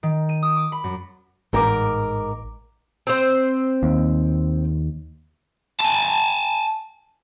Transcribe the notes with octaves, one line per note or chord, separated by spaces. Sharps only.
D#3
D#7
D#6
D6
B5
F#2
A1 G#2 A#4 D6
C4 C5
D#2
G#5 A5